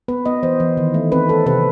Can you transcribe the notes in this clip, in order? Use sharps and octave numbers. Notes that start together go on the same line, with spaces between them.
B3 B4
B3 D#5
E3 C5
E3
D#3
A3
C4 B4
C4 A4
C3 B4